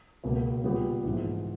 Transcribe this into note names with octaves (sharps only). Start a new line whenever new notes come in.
C#2 B2 A#3
A#2 G3 B3 G4
A#1 G#2 E3